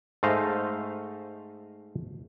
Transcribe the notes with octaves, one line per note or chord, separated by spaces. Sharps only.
G#2 A3 C5 D#5 F5